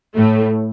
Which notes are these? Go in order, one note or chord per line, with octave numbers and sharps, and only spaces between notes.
A2 A3